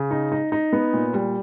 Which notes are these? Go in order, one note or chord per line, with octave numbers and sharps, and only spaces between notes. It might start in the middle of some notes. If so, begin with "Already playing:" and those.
Already playing: C#3
D#4
D#4
D#4
B3
A#2
G3